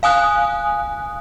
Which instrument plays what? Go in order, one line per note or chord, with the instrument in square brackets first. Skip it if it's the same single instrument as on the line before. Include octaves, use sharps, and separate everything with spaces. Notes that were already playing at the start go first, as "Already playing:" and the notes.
[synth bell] F5 G#5 D#6 F#6